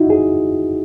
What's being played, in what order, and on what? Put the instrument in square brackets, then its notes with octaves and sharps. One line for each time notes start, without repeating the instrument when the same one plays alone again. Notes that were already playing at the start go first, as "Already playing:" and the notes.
Already playing: [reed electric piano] D#4 E4 F#4
G#4